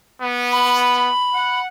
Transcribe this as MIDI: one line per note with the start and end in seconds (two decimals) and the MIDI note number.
0.22 1.09 59
0.53 1.61 83
1.33 1.66 78